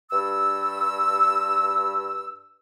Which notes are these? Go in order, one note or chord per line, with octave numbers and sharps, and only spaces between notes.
G2 E6